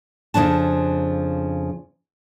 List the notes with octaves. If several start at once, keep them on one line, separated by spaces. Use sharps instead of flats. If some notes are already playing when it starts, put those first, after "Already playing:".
F2 C#3 F3 D4 A5